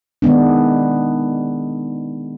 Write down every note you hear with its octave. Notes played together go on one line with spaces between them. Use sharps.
D#3 G#3 B3 D4